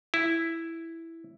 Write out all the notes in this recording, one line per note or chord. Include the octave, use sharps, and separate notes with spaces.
E4